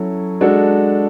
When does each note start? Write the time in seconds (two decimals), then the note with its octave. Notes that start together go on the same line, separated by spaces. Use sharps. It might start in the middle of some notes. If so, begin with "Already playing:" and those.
Already playing: F#3 C#4 E4 A4
0.41 G#3 D4 F#4 A4